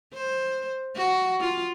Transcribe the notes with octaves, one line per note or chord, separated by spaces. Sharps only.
C5
F#4
F4